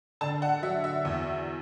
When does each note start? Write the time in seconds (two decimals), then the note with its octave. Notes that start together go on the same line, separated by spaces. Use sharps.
0.21 D3 A5
0.42 F#5
0.62 F#3 E5
0.84 E5
1.05 E2